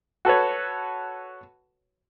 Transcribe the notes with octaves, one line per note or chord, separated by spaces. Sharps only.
F#4 A4 B4 C#5